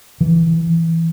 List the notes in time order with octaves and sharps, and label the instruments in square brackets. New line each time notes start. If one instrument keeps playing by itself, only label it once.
[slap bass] E3